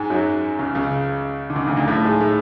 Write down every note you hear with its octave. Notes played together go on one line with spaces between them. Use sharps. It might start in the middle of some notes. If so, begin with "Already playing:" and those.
Already playing: G#2 G#3
F#2 F#3
C#2 C#3
C#2 C#3
D3
C#2 C#3
D2 D3
D2 D3
A2 A3
G#2 G#3
A2 A3